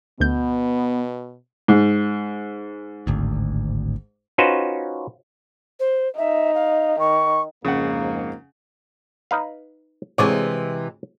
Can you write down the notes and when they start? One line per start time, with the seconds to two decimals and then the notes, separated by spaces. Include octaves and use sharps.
0.20 D2 B2 B3 G6
1.68 G#2
3.07 D1 G#1 D2
4.38 C#4 D#4 F4 F#4 B4 C5
5.80 C5
6.18 D#4 E5
6.55 F5
6.99 D#3 C#6
7.65 F2 G#2 C#3 A#3 F#5
9.31 D#4 B4 F5
10.18 D2 C3 E3 G#3 C#5 D5